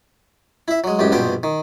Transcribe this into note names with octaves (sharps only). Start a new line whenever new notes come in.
E4 E5
F#3 G#3
A1 F#2 G#3 G4
A#1 G2 B2 C5 G5
D#3